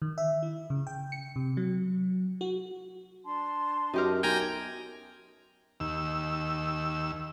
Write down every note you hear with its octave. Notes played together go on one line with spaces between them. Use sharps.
D#3
E5
E4
C#3
G5
C#7
C3
F#3
F#4
D4 A5 C6
F#2 D#4 G4 A#4
B1 G5 G#5 A#5
D#2 E6